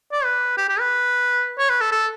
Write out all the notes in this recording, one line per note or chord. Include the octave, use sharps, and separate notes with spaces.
D5
B4
G4
G4
B4
C#5
B4
A4
A4